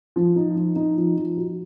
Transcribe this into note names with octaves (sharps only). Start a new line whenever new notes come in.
F3
D#4
F3
D#4
F3
F3
F#4